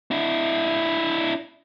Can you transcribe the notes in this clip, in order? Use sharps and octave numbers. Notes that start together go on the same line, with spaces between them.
D4 E4